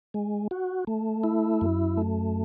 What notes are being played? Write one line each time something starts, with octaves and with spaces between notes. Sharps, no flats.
G#3
F#4
A3
E4
F#2
A3